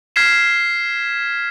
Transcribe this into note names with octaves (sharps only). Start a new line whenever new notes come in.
F6 G#6 B6 C7 E7